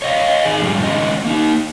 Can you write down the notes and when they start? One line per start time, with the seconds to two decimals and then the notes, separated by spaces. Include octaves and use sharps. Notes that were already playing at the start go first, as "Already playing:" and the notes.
0.02 C#5 D#5 F5
0.45 D#3 G#4
0.62 F2 G#2 G3
0.83 D#3 G#3 C#4 D#5
1.25 A#3 D#4